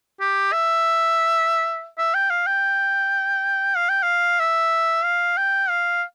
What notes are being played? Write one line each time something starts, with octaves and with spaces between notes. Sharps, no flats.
G4
E5
E5
G5
F5
G5
F5
G5
F5
E5
F5
G5
F5